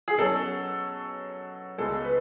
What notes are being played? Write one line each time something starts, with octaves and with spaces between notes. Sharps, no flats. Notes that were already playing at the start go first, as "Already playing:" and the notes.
G#4
B2 F#3 C#4 A4
C#2 B2 G#3 A4
B4